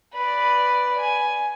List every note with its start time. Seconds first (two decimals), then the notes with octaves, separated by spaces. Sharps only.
0.14 B4 D5
0.98 G#5